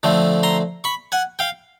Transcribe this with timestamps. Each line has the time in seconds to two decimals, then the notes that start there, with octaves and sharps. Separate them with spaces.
0.03 D3 F3 A3 C4
0.43 A#5 C6
0.84 B5 C#6
1.12 F#5 G#5
1.39 F5 G5